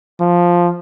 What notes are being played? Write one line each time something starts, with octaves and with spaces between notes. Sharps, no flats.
F3